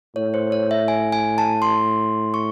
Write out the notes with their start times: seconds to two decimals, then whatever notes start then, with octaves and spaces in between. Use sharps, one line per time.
0.16 A2 C#5
0.34 C5
0.52 C#5
0.71 E5
0.88 G#5
1.12 G#5
1.38 A5
1.62 C6
2.34 C#6